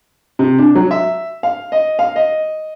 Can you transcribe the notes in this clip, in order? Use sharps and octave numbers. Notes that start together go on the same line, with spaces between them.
C3
D4
F#3
E5
F5
D#5
F5
D#5